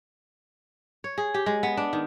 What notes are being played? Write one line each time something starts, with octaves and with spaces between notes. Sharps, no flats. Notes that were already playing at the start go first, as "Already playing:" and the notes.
C#5
G#4
G4
G#3
B3
D4
D#3